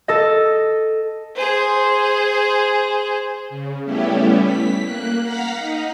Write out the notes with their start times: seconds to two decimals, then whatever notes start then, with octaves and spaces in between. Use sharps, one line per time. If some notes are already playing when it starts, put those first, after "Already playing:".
0.08 A4 D#5
1.36 G#4 C5
3.49 C#3
3.85 G3 A3 B3 C#4 E4 G4
4.44 B6
4.84 A#3 F#6
5.23 F5 F#5 A#5 B6
5.58 D#4